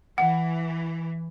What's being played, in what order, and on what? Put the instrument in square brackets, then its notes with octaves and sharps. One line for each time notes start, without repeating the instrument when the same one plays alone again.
[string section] E3 [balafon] F#5